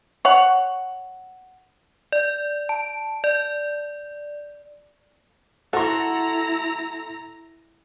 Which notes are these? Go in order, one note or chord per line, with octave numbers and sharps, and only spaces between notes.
C#5 F#5
D5
A5
D5
E4 F#4 A4 A#5 C6